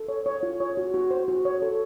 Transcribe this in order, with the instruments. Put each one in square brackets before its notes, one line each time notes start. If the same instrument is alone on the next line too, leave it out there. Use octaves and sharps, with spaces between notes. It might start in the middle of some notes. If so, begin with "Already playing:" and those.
Already playing: [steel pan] A4
C#5
C#5
F4
C#5
F#4
F#4
C5
F#4
C#5
A4